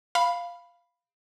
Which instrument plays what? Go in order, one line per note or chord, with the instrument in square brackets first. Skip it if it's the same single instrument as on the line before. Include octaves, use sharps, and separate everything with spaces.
[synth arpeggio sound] F5 B5